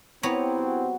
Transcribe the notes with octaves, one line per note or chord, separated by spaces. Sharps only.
B3 C4 E4 G4 B4 C#5 A#5 C#6
F#3 G#4 F#5